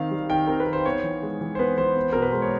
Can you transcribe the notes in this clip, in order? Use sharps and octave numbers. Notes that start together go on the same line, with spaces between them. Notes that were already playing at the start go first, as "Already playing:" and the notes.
Already playing: D#3 C4 F5
G3
D#3 G5
C4 A#4
B4
D#3
C5
B3 C#5
E3
G#3
E3
C5
B3 B4
E3 C5
B3
B2 A#4
B4
G#3 C5
C#5